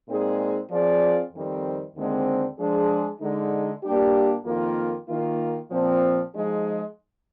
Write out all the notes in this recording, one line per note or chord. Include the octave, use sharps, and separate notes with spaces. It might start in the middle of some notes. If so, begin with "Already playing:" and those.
A#2 G#3 C4 D#4 G#4
F3 C4 F4 G#4 D5
F2 D#3 G3 C4
D#2 D3 G#3 C4
F3 G#3 D4 G#4
D3 G#3 D#4
A#2 G3 A#3 D4 G4
F2 D#3 A#3 F4
D#3 A#3 F4
A#2 F3 C4
F3 G#3 D#4 G#4